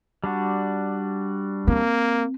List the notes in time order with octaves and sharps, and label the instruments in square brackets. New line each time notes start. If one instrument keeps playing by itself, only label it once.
[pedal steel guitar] G3 D4 F#4
[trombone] A#3 [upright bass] C4